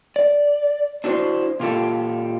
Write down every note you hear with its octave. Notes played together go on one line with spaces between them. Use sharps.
D5
D4 E4 F#4 A4 C5
A#2 F4 G4 A4